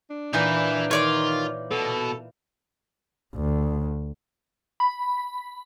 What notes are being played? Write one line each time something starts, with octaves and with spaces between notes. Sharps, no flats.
D4
A#2 E3 D#4 E4 B4
D#3 F4 C#5 D5 D6
B2 A4
D2
B5